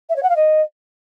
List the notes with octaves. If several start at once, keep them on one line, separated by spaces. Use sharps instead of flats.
E5
C#5
F#5
F5
D#5